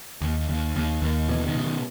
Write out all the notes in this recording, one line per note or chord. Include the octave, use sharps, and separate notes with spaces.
D#2
D#2
D#2
D#2
B2 E3
D#3
B2
D#3